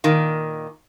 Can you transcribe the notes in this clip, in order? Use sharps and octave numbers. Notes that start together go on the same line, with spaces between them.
A#2 D#3